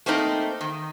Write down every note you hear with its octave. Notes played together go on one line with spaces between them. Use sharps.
A3 A#3 C4 D#4
D#3